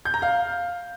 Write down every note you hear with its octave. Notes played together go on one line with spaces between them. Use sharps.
G6
A#5
F5